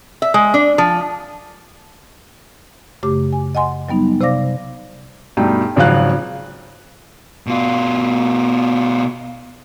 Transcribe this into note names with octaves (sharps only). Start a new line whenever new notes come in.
E5
G#3
D4
F3
F#2 C#3 A3 G4 D6
G#5
D#5 F#5 G#5 C6
F#3 G3 B3 D#4
C3 C5 D5 F5 D6 A#6
G2 B2 A3 D#4 G5
G#1 C#3 F3 F#3 F5 F#6
B2 F4